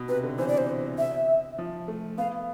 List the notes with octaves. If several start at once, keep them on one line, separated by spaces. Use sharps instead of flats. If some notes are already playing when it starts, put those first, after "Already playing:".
Already playing: B2
C3 B4
D3
E3 C5
D5
C5
E5
F3
A3
B3 F5